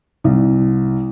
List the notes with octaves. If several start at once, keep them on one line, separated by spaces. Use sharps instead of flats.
C2